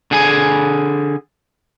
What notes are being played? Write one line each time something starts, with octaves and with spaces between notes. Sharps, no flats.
D3 G#4 G#5